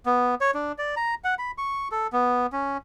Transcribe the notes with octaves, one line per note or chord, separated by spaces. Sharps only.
B3
C#5
D4
D5
A#5
F#5
B5
C#6
A4
B3
C#4